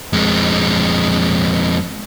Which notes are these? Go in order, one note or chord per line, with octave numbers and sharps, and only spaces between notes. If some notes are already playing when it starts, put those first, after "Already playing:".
F2 G#3